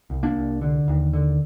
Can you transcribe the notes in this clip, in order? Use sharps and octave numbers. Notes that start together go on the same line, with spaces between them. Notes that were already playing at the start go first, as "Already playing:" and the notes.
C2
A#3 D4
C2
D3
D#2
D3